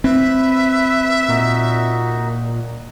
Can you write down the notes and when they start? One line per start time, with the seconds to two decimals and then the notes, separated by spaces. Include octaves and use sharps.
0.04 C4 B4 E5 B5
1.28 A#2 D#4 F#4